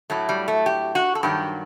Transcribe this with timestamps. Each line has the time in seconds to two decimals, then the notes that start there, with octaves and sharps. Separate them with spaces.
0.10 A2 F#3 A3
0.29 G3
0.48 A3
0.66 G4
0.95 F#4
1.15 A4
1.23 G2 D#3 F#3 G4